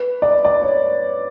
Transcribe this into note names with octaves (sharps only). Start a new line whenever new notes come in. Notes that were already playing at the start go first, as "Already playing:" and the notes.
Already playing: B4
D5
D5
C#5